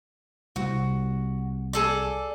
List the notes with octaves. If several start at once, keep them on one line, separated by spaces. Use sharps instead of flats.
C2 F#4
G#4 A4 D5